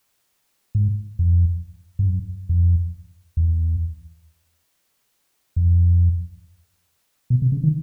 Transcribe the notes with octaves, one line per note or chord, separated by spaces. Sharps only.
G#2
F2
G2
F#2
F2
E2
F2
B2
C3
C#3
D#3